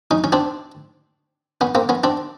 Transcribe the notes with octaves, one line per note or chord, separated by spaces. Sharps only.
C#4 D#4
C#4
C4 D4
B3 C#4
A#3 C4
B3 C#4
C4 D4